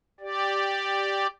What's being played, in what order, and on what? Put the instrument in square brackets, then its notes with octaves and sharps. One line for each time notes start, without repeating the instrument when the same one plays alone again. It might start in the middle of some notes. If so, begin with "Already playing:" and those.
[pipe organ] G4 D5